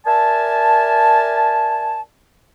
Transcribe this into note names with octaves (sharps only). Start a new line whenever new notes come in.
A#4 D5 E5 G#5 A5